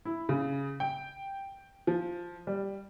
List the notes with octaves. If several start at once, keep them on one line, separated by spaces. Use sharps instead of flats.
E4
C#3
G5
F3
G3